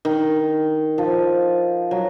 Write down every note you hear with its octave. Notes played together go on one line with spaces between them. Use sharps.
D#3
F3
F#3